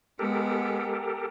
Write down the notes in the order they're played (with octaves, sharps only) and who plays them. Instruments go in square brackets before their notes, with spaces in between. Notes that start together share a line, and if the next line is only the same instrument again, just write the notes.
[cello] G#3 B3 [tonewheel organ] G4 A4 A#4